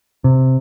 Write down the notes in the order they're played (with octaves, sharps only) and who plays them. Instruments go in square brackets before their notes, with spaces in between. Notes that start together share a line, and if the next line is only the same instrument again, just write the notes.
[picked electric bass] C3